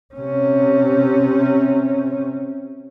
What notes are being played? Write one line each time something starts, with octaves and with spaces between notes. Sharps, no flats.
C3 C#4